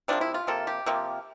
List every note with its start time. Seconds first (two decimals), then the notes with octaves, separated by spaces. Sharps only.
0.08 C3 F3 A#3 D4
0.21 E4
0.34 F4
0.47 C3 F3 A#3 A4
0.67 G4
0.86 C3 F3 A#3